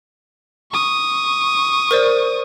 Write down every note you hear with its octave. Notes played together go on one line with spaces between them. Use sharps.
C#6 D#6
A#4 C5 D5